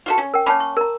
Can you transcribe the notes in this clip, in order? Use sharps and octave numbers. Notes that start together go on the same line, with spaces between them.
F4 F#4 A4
C#4
A#4 G5
A#3 C#4 C#5 A5 B5
C#6
A#4 A#5